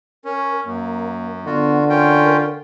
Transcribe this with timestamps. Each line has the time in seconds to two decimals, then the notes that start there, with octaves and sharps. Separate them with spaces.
0.25 C#4 A#4
0.65 F#2 A#3
1.46 D3 B3 F4 F#4
1.90 C#4 F4 A#4 G5